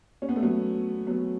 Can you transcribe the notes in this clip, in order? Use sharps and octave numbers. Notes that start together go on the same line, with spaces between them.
C#4
B3
A3
F#3 B3
F#3 B3